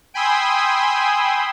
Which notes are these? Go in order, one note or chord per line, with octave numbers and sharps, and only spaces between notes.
G5 G#5 B5 C6 D#6 E6